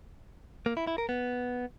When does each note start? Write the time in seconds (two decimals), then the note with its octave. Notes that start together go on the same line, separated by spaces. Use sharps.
0.66 A#3
0.77 E4
0.87 E4
0.98 A#4
1.09 B3